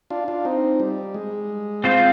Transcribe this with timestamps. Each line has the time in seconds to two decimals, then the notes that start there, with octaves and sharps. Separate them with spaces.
0.10 D4 F4
0.28 D4 F4
0.45 C4 D#4
0.80 G3
1.14 G#3
1.84 C4 F4 C5